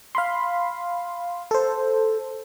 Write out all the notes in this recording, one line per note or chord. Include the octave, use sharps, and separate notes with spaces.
F5 B5 C6
A4 C5